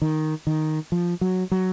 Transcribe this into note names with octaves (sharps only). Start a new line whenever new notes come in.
D#3
D#3
F3
F#3
F#3